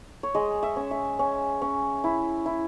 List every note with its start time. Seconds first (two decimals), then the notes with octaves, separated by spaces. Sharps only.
0.23 C#5
0.35 G#3 D#5
0.63 E5
0.76 C#4
0.91 E5
1.19 C#4
1.62 C#4
2.04 E4
2.46 E4